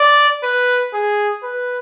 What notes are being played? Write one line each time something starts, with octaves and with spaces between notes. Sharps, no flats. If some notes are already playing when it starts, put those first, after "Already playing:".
Already playing: D5
B4
G#4
B4